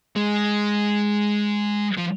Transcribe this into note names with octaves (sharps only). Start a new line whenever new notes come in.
G#3
F3